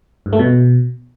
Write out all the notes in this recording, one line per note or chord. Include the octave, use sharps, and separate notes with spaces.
G2
A3
B2